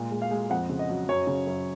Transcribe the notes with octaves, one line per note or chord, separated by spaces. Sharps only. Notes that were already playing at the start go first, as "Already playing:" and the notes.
Already playing: A#2 G#3
G#3
F5
G#3
F2 F#5
C#3
D#5
F#3
F#2 C#5
C#3
F#2